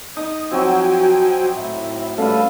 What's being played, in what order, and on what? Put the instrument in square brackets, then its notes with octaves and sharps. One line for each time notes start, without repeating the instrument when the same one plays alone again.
[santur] D#4 [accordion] D#6
[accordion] F3 G5 G#5 [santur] F#3 C4 [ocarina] F#4
[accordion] A2 [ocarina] E5
[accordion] G3 [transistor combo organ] A3 C#4 A4 [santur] B4 F5